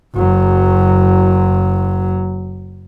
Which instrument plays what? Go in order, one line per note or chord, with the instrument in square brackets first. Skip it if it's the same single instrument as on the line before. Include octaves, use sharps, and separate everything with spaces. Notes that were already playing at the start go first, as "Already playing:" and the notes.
[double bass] F#1 F#3